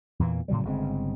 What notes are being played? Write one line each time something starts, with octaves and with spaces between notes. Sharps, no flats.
E2 A#2 E3 A#3
A2 C#3 F#3 G3
G1 C#3 G#3 C4